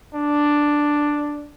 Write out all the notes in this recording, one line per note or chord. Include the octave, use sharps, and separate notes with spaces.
D4